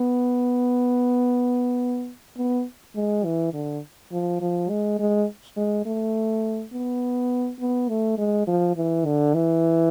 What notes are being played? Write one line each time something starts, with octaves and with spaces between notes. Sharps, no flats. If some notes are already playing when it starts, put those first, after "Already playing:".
Already playing: B3
B3
G#3
E3
D3
F3
F3
G#3
G#3
G#3
A3
B3
B3
A3
G#3
F3
E3
D3
E3